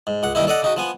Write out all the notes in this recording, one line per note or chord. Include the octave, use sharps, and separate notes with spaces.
G#2
C#2 F#5
G2 D#3 A#3 D#4 E4
A4 D5 D#5 F#5
C#3 D#4 F#4
F3 B3 G#5